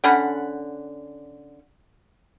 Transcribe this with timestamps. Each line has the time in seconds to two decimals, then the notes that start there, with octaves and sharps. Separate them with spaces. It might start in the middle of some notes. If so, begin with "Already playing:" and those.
0.04 D3 C#4 F#5 B5